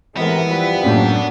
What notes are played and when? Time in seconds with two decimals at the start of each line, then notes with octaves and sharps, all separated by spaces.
0.17 A2 C3 E3 G#3 B3 A#4
0.49 F3 G3 E4 B4
0.83 F#2 A2 F#3 A#3 D4